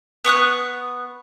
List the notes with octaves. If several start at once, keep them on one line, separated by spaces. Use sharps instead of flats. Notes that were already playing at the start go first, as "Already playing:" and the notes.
B3 C#6 D#6 F#6